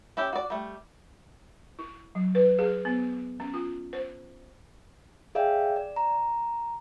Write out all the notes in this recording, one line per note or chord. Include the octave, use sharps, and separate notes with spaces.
C#4 E4 G4
F#4 D5
G3 A3
E4
F#3
B4
G#4
B3
C#4
F4
C5
G#4 D5 E5 F5 G5
D5
A#5